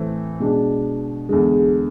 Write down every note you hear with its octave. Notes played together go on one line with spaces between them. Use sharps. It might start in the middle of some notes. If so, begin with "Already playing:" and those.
Already playing: A2 E3 A3 C4
B2 G#3 D4
E2 D3 G#3